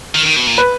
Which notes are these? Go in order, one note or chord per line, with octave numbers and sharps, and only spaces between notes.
D#3
D#3
B2
A#2
B4